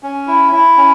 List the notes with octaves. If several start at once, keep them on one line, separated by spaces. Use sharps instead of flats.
C#4
E4
E4
C#4